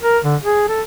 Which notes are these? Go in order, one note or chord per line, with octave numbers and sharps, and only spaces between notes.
A#4
D3
G#4
A4